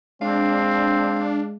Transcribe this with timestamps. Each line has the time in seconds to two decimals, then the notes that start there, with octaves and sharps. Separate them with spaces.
0.22 G#3 C4 D4 F5